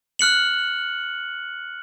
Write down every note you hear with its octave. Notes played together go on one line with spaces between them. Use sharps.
F6 F#6 C#7 F#7